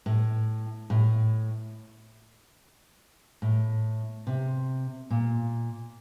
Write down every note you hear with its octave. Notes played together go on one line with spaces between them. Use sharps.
A2
A2
A2
C3
A#2